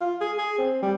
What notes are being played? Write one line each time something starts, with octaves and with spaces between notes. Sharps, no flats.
F4
G#4
G#4
C4
G3